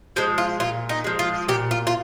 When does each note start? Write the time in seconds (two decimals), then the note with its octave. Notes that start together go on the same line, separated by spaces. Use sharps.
0.16 F3 G#3 C5
0.38 F4
0.60 A#2 F4
0.89 D#4
1.04 F3 G#3
1.19 F4
1.48 A#2 G4
1.71 F4
1.87 F4